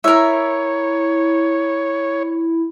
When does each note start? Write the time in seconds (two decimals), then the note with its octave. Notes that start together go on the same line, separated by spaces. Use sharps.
0.04 E4 A#4 C#5 E5